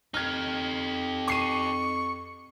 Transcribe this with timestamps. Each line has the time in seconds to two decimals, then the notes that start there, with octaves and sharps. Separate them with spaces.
0.14 F2 D#4 G4 F6 G#6
1.28 C#6 D6 C7 D#7